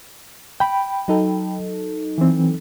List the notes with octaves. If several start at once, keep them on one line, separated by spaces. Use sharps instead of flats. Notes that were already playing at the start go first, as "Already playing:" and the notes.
G5 B5
F#3 D#4 A4
E3 C4